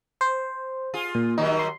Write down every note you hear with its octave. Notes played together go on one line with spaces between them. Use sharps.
C5
F4 G#4
A#2
D#3 F#3 G3 D#4
C6